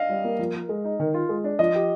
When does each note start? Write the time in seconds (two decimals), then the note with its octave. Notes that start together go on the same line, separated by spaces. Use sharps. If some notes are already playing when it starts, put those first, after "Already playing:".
Already playing: D4 D#5 F5
0.09 G3
0.24 A#3
0.39 F3
0.54 A#4
0.69 G#3
0.85 D#4
1.00 D#3
1.14 F4
1.29 G#3
1.44 D4
1.59 F3 D#5
1.75 G4